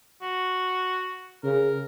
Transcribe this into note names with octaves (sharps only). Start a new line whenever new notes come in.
F#4
C#3 A#4